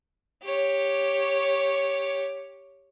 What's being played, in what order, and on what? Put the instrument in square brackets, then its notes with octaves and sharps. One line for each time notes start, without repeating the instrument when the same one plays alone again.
[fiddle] G4 C#5